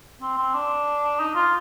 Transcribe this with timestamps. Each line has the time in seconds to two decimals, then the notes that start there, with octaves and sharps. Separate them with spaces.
0.22 C4
0.38 C4
0.54 D4
1.20 D#4
1.36 F4